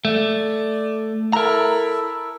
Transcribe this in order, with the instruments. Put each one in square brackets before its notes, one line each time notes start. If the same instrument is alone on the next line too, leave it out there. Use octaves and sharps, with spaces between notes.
[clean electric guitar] A3 [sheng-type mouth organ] D5
[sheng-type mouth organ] E4 A4 [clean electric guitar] A#4 A#5